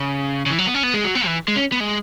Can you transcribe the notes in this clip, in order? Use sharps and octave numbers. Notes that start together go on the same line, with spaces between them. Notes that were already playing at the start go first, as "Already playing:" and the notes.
Already playing: C#3
C#3
E3
F#3
B3
C#4
B3
G#3
F#3
B3
E3
G#3
C#4
B3
G#3